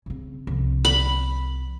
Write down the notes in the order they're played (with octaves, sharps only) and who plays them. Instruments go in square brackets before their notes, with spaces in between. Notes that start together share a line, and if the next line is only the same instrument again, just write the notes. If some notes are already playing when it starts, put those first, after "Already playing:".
[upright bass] C#3 C4
C2 F3
[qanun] B5